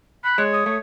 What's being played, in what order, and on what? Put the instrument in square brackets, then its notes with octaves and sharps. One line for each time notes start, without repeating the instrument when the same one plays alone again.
[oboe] B5 [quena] F#6
[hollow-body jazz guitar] G#3 [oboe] C#5
[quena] D#6
[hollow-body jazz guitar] A3 [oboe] C#5